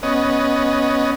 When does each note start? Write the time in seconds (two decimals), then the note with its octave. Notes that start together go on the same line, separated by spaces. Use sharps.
0.03 B3 C#4 D#5